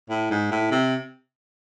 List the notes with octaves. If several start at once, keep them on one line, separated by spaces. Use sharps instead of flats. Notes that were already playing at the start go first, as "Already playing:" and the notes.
A2
G#2
A2
C3